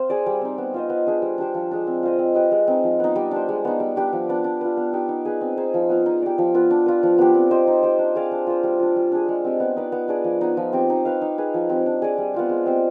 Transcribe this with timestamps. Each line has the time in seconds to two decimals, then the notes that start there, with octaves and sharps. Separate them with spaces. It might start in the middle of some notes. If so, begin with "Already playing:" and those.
Already playing: C4 C5 F5
0.10 G#4 D5
0.26 G3
0.41 C4 D#4
0.58 B3
0.74 F4 C5 D#5
0.90 B3
1.07 D4 G#4 C5
1.22 G3
1.38 D4 G4 C5
1.54 F3
1.71 G#3 D4
1.87 C4
2.03 F4 C5 D#5
2.19 C4
2.35 G4 B4 D#5
2.51 G#3
2.67 C4 D#4
2.84 F3
3.00 B3 D#4
3.16 G3
3.31 D4 G4 C5
3.49 G#3
3.65 B3 D#4
3.80 G3
3.96 D4 G4 B4
4.13 F3
4.29 B3 D4
4.44 D4
4.61 F4 B4
4.77 B3
4.93 D#4 G4
5.09 D#4
5.25 G#4 B4
5.41 C4
5.57 D#4 G#4 C5
5.74 F3
5.90 B3 F4
6.06 D#4
6.22 G4 D5
6.38 F3
6.54 B3 F4 B4
6.71 D4
6.86 F4 B4
7.03 F3
7.18 B3 D4 G4
7.34 C4
7.50 G4 C5 D#5
7.67 D#4
7.83 G4 C5
7.98 D4
8.15 G#4 D5 F5
8.31 D4
8.47 F4 C5
8.63 G3
8.80 D4 F4
8.96 G3
9.12 D4 G#4
9.29 G#3
9.45 C4 G4
9.60 B3
9.76 D#4 B4 D5
9.92 B3
10.08 D4 G#4 D5
10.24 F3
10.41 B3 D#4
10.57 F3
10.73 C4 G4
10.90 D#4
11.05 B4 F5
11.22 D#4
11.38 G#4 B4
11.54 F3
11.70 C4 G4
11.86 D4
12.02 G#4 D5
12.18 G3
12.34 B3 F4 C5
12.50 G#3
12.66 C4 G4 C5